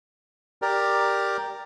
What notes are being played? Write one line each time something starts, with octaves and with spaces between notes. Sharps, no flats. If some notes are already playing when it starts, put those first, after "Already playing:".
G4 A#4 D5